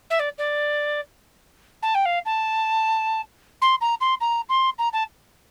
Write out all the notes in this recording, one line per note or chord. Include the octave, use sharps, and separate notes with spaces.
E5
D5
D5
A5
G5
F5
A5
C6
A#5
C6
A#5
C6
A#5
A5